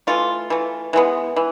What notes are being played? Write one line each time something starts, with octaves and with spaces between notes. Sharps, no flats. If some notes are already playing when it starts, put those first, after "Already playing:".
E3 A3 F4
E3 A3
E3 G#3 B3
E3